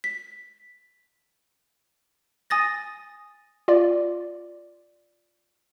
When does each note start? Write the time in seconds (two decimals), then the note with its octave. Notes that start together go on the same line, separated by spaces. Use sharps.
0.04 B6
2.50 G#5 D#6 A6 A#6
3.68 F4 D5